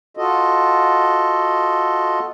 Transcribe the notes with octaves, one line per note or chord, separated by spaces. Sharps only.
F4 F#4 A4 D#5